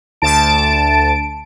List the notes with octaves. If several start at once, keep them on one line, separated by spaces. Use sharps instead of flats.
D2 A5 D7